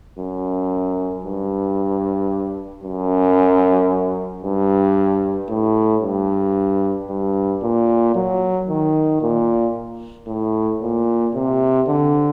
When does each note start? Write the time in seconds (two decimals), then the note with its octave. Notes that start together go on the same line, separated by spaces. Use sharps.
0.18 F#2
1.24 G2
2.84 F#2
4.43 G2
5.49 A2
6.02 G2
7.09 G2
7.63 A#2
8.15 F#3
8.69 D#3
9.22 A#2
10.27 A2
10.82 A#2
11.34 C3
11.88 D3